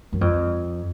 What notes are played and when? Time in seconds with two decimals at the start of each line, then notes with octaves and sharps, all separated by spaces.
0.12 F#2
0.21 F2